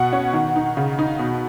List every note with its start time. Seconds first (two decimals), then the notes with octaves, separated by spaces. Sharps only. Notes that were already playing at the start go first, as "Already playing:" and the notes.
Already playing: B2 F#5
0.13 C#4
0.33 D#3
0.56 D#4
0.77 C#3
0.99 D#4
1.19 B2